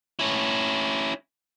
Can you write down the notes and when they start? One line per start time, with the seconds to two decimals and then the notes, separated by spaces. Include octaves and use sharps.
0.19 C#4 E4